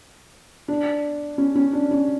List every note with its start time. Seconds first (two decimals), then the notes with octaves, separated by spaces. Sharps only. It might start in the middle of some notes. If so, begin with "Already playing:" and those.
0.68 D4
1.38 C#4
1.55 C#4
1.73 D4
1.91 C#4